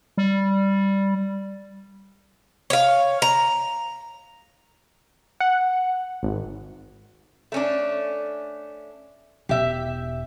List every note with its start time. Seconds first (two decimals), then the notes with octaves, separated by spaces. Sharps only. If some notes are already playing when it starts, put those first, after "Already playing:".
0.18 G3
2.70 C#5 F5
3.22 A#5
5.40 F#5
6.23 G#1
7.52 A3 C#4 D4
9.49 E1 G4 E5